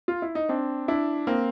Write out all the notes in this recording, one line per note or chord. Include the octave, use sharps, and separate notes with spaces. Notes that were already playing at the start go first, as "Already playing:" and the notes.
F4
E4
D#4
C4 D4
D4 E4
A#3 C4